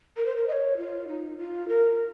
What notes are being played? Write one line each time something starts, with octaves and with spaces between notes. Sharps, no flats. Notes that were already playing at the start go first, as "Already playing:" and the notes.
A#4
C5
A#4
D#5
C#5
F4
D#4
F4
A#4